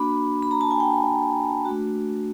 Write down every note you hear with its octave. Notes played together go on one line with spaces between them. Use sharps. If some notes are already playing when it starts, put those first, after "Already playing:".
Already playing: A#3 D4 F#4 B5
B5
A#5
A5
G#5
G5
A3 D4 F#4